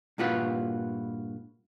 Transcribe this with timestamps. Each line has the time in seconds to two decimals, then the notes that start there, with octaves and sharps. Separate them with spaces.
0.18 G2 A#2 F4 F#4 B4